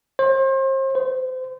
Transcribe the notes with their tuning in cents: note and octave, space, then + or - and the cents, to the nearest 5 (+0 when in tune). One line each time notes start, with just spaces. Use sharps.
C5 +35
C5 -30